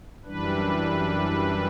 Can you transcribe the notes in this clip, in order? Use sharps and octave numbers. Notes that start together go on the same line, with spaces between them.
F#2 E3 G3 D4 B4